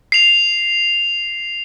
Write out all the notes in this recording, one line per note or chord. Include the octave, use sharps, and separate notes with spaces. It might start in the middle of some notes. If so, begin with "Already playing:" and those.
C7 F7